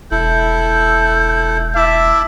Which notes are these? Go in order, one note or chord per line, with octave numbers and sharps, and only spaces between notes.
E1 E4 A4 G6
E4 E5 A5 D6